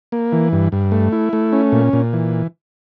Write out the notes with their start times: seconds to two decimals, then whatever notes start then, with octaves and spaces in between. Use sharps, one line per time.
0.12 A#3
0.32 E3
0.52 G2
0.72 G2
0.92 A3
1.12 E4
1.33 A3
1.52 C#4
1.72 A#2
1.93 A#2
2.13 E3